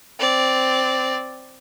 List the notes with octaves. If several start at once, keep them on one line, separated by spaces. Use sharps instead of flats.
C4 D5